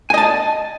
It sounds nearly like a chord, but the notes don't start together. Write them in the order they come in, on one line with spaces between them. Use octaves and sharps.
G#5 D#5 A5